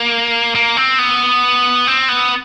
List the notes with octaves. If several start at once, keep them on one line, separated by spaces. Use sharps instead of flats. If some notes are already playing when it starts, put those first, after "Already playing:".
Already playing: A#3
A#3
C4
B3
C4
B3